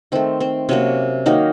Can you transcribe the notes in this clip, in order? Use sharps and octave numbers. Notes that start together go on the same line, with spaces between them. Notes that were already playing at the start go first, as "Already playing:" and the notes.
D#3 A3 C4
C4
C3 F#3 A#3 C#4
D#3 F#3 A#3 D#4